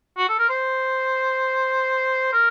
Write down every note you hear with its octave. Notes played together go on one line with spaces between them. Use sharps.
F#4
A4
A#4
C5
A#4